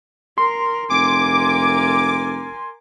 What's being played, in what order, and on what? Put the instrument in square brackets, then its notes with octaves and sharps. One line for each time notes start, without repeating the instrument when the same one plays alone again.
[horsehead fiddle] A#4 [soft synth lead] C6
[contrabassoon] F1 [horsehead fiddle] A#4 G#5 [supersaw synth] D6